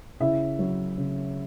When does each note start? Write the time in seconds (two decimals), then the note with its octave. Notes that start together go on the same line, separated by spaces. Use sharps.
0.20 C#3 E4 E5
0.59 F#3
0.97 C#3